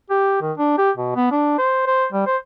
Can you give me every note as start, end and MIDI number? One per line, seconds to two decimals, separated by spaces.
0.10 0.39 67
0.42 0.52 51
0.58 0.73 62
0.78 0.91 67
0.97 1.12 47
1.16 1.29 59
1.31 1.56 62
1.58 1.85 72
1.87 2.06 72
2.12 2.26 55
2.26 2.37 72